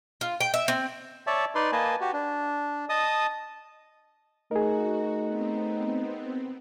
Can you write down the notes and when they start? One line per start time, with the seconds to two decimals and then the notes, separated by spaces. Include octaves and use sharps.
0.21 F4
0.41 G5
0.54 E5
0.68 C4
1.27 C#5 D5 E5 A5
1.55 D#4 B4 D5 C6
1.73 A#3 B4 D#5 G#5 A5
2.01 F#4 G4
2.13 D4
2.89 D#5 A5 D#6
4.51 A3 D#4 F#4 G#4 A#4
5.25 B3 C4